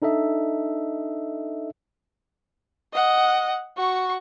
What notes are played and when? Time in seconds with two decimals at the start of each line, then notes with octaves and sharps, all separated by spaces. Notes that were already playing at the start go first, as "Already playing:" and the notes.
0.02 D4 D#4 A4 D#5 E5
2.94 D#5 F#5
3.77 F#4 C#6